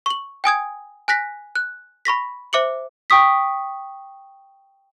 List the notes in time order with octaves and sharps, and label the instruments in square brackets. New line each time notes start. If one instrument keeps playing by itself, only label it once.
[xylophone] C#6 F#7
G5 G#5 D#6 G#6
G#5 F#6 A#6 B6
F#6
B5 C#6 A#6 B6
C5 E5 D6 C#7 F#7
G5 C#6 D#6 B6